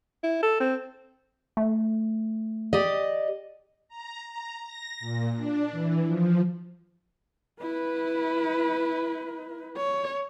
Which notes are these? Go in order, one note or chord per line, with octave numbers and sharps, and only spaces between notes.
E4
A4
C4
A3
G4 D5 D#5
A#5
A#5
A#6
A#2
D4
E3
F3
E4 B4
C#5